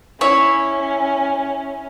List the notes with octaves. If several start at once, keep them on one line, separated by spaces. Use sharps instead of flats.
C#4 E4 C#5